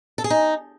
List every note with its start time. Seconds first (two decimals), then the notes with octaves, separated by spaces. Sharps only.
0.18 A4
0.24 G#4
0.30 D#4